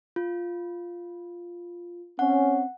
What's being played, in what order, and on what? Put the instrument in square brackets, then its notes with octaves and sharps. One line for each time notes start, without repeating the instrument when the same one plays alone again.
[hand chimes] F4
[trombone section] C4 C#4 [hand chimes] F#5